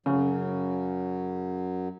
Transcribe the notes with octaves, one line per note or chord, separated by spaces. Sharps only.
F#2 C#3 F#3